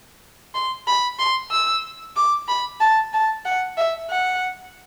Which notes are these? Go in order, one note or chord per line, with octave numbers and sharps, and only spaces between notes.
C6
B5
C6
E6
D6
B5
A5
A5
F#5
E5
F#5